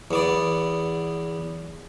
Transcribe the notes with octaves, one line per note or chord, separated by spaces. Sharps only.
E2 B3 D5